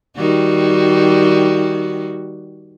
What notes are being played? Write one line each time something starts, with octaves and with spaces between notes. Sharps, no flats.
D#3 G3 F#4